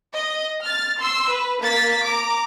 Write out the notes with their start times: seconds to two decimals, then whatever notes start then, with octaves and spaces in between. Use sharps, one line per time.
0.13 D#5
0.63 F6 A6
0.98 C6 E6
1.29 B4
1.63 A#3 A6 B6
2.04 A#5 D6